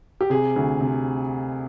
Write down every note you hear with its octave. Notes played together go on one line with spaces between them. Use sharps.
G4
C3 G#4
D2
C3